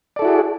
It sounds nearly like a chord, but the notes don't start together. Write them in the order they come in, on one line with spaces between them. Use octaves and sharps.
D5 A4 E4 F#4 G#4